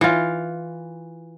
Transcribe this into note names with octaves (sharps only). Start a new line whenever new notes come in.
E3 F4